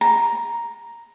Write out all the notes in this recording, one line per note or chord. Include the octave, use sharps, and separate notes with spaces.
A#5